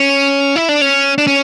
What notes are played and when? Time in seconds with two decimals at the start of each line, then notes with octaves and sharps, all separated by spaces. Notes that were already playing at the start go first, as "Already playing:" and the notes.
Already playing: C#4
0.56 E4
0.69 D4
0.81 C#4
1.18 D4
1.27 C#4